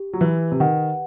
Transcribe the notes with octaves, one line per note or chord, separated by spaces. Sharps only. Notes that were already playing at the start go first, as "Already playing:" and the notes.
Already playing: G4
F#3
E3 B4
C3
D#3 F#5